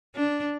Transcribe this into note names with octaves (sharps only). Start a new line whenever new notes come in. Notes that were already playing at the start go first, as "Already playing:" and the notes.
D4